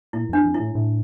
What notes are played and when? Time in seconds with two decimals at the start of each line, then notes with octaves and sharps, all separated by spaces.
0.13 A#2 E4
0.29 F2 D4
0.45 F2
0.55 E4
0.60 A2
0.75 A2